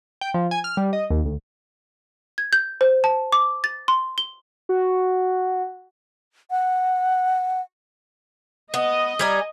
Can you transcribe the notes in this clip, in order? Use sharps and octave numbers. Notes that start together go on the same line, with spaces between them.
G5
F3
G#5
F6
G3
D#5
D#2
D2
G#6
G6
C5
A5
D6
A6
C6
G7
F#4
F#5
B3 D#5
G3 G#5 A#5